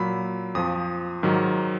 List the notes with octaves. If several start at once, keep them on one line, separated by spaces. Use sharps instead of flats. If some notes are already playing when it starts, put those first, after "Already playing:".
Already playing: A#2 F#3 B5
F2 F3 D#6
G#2 D#3 F#3